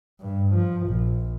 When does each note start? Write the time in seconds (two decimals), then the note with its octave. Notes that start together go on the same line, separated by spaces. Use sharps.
0.21 G2
0.54 F3
0.87 A#1